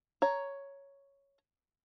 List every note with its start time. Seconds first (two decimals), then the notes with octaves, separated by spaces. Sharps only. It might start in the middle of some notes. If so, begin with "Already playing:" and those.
0.22 C#5 A#5